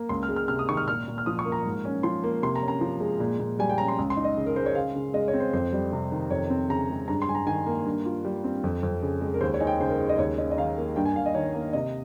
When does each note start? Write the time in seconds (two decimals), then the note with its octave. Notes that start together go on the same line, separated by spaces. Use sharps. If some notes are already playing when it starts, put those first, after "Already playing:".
Already playing: A#3
0.09 C#2 C6
0.23 F6
0.29 G#3
0.36 F6
0.48 C3 F6
0.59 D#6
0.69 D#3 C#6
0.77 F6
0.88 A#2 F6
1.08 A#2
1.18 F6
1.26 F3 D#6
1.39 C#6
1.45 A#3
1.52 A#5
1.65 G#2
1.85 C#4
2.03 F3 C6
2.24 A#3
2.42 C3 C6
2.56 A#5
2.62 C#4
2.68 A#5
2.81 F3
3.00 G#3
3.20 A#2
3.39 A#2
3.59 G3 G#5
3.69 G5
3.78 C#4 A#5
3.88 C6
3.99 C#2
4.10 C6
4.17 D#4
4.24 D#5
4.37 C#3
4.46 A#4
4.56 G#3 C5
4.66 C#5
4.75 C#3 F5
4.96 C#3
5.14 G#3 D#5
5.28 C#5
5.34 C4
5.40 C5
5.53 F2 C5
5.73 G3
5.92 C3
6.12 D#3
6.30 F2 C#5
6.50 C4
6.70 C#3 A#5
6.90 G#3
7.08 G2 A#5
7.22 C6
7.28 G2 G#5
7.35 A#5
7.47 D#3 G#5
7.66 A#3
7.85 G2
8.06 F4
8.25 G3
8.44 C4
8.64 F2
8.83 F2
9.03 C#3
9.21 G#3
9.34 A#4
9.41 D#2 C5
9.54 C#5
9.60 D#4 G#5
9.67 G5
9.80 C#3 C5
9.89 A#4
9.99 G#3
10.09 D#5
10.18 D#2 C#5
10.38 C#4 D#5
10.51 D#5
10.57 D#3 F5
10.77 A#3
10.96 G2 G5
11.05 G#5
11.15 G2 F5
11.26 D#5
11.35 D#3 C#5
11.54 A#3
11.73 C3 D#5